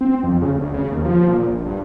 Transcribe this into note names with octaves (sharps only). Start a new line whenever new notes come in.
C4
F2
C#3
D2
C#3
D#2
F3
A#2
A#1
G2